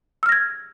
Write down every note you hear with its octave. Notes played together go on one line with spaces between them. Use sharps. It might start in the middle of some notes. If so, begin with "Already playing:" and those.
E6 F6 G#6 A#6